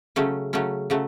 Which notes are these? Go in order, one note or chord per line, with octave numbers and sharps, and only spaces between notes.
C#3 F#3 A3 C#4
C#3 F#3 A3 C#4
C#3 F#3 A3